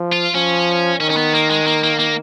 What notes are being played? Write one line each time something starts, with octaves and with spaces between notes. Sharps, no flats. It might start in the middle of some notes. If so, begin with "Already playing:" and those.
Already playing: F3
F4
F3 C#4
D#3 C#4
C#4
B3
A#3
G#3
A#3
A#3
A#3